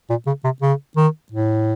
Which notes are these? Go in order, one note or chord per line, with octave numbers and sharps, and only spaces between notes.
A#2
C#3
C3
C#3
D#3
A2